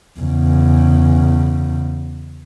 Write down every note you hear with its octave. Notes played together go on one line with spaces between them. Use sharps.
E2 C#3